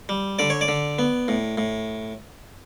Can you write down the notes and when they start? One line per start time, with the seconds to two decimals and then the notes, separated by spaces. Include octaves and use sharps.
0.09 G3
0.39 D3 D5
0.50 C#5
0.61 D5
0.68 D3
0.99 B3
1.28 A2
1.58 A2